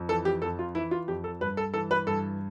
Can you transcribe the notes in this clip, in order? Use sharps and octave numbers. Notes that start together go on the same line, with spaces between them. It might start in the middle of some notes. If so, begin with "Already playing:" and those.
Already playing: F2
E3 A4
G4
F2 A4
F4
E3 E4
F4
F2 G4
A4
G2 B4
A4
E3 A4
B4
G2 A4